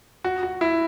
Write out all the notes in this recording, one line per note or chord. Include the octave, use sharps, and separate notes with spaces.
F#4
F#4
E4